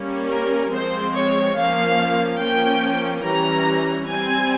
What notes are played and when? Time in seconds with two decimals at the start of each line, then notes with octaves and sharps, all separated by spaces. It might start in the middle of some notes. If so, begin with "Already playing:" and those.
Already playing: G3 A#3 C#4
0.30 A#4
0.72 F3 G#3 C4 C5
1.14 C#5
1.56 F3 A#3 C#4 F5
2.40 F3 A#3 C#4 G5
3.24 E3 G3 C#4 A#5
4.08 G3 C4 G#5